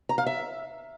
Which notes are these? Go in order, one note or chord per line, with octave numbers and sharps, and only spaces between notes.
A#5
F5
E5